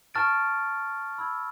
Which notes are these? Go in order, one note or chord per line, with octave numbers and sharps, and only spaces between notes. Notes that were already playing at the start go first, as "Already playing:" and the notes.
A5 C#6 F6 A6 D7
B5 E6 G#6